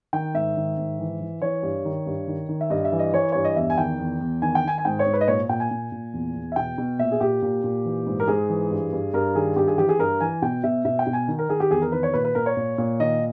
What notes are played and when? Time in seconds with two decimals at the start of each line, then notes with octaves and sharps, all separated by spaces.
0.13 D#3 G5
0.34 G#2 E5
0.57 D#3
0.77 G#2
0.99 E3
1.20 E3
1.42 E3 C#5
1.63 G2
1.85 D#3
2.06 G2
2.27 D#3
2.49 D#3
2.61 E5
2.70 G2 D#5
2.85 E5
2.92 E3
2.99 D#5
3.13 E3 C#5
3.32 G2 C#5
3.44 D#5
3.56 E2 E5
3.70 G#5
3.78 D#3 G5
3.99 E2
4.21 E2
4.42 D#3 G#5
4.55 G5
4.64 D#3 G#5
4.78 G#5
4.85 G#2 G5
4.99 C#5
5.06 G#2
5.13 B4
5.21 D#5
5.28 A#2 C#5
5.49 A#2 G5
5.60 G#5
5.71 A#2
5.92 A#2
6.14 E2
6.35 E2
6.52 E5
6.56 B2 G5
6.78 B2
6.99 A#2 E5
7.11 G#4
7.20 A#2 G4
7.42 A#2
7.64 A#2
7.85 E3
8.07 G#2
8.20 A#4
8.28 G#2 G#4
8.49 E3
8.71 G2
8.92 G2
9.14 G2 A#4
9.35 D#3 G#4
9.56 G2 G4
9.67 G#4
9.78 E3 G4
9.89 G#4
9.99 G2 A#4
10.21 E3 G#5
10.42 B2 G5
10.64 B2 E5
10.85 B2 E5
10.99 G5
11.07 B2
11.13 G#5
11.28 D#3
11.39 A#4
11.49 D#3 G#4
11.60 G4
11.71 E2 G#4
11.82 A#4
11.92 D#3 B4
12.03 C#5
12.14 A#2 B4
12.25 B4
12.35 A#2 A#4
12.46 C#5
12.57 A#2
12.78 A#2
13.00 D#3 D#5